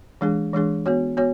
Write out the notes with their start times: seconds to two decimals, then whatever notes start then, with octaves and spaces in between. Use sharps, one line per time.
0.21 E3 G#3 D4 G#4
0.54 E3 G#3 D4 G#4
0.86 B3 F#4 C#5
1.17 B3 F#4 C#5